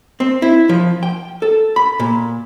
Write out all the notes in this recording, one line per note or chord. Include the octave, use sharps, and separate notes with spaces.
C4
E4
F3
G5
A4
B5
A#2